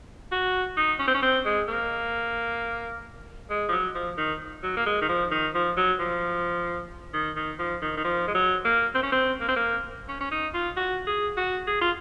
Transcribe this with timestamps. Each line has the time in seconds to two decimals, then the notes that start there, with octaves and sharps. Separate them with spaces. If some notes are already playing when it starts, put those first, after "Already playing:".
0.32 F#4
0.77 D#4
0.99 C#4
1.07 C4
1.14 C#4
1.23 C4
1.45 G#3
1.68 A#3
3.50 G#3
3.69 F3
3.72 F#3
3.95 F3
4.17 D#3
4.63 F#3
4.77 A#3
4.86 G#3
5.01 D#3
5.09 F3
5.31 D#3
5.55 F3
5.77 F#3
5.99 F3
7.14 D#3
7.36 D#3
7.59 F3
7.82 D#3
7.97 D#3
8.04 F3
8.27 G#3
8.34 F#3
8.65 A#3
8.95 C4
9.03 C#4
9.12 C4
9.41 A#3
9.48 C4
9.56 A#3
10.08 C#4
10.21 C#4
10.31 D#4
10.54 F4
10.77 F#4
11.07 G#4
11.37 F#4
11.67 G#4
11.81 F4